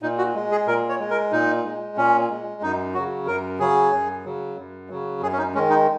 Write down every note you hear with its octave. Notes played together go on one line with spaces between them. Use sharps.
A#2 D#4
F#4
G#3
G#4
A#2 A#4
C#5
G#3
A#4
A#2 D#4
G#3
A#2 C#4
G#3
F#2 D#4
C#3 F#3 F#4
F#2 A#4
C#3 F#3 G#4
F#2
C#3 F#3
F#2
C#3 F#3
F#2 G#4
C#4
D#4
D#3 G#3 C#4
D#4